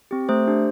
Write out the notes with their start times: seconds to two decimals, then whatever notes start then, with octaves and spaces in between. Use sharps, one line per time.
0.11 C4 G4
0.29 A3 C5
0.47 D4 G4